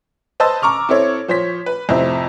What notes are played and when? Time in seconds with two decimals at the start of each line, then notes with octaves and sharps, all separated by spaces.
0.40 B4 C5 D#5 A5 E6 A6
0.62 A#5 C#6 D6 F6
0.89 C4 E4 A4 C#5
1.28 F3 C5 C#5 B6
1.66 B4
1.89 F2 A2 C3 C4 E5